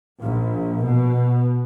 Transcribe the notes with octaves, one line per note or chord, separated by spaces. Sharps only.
A#1
B2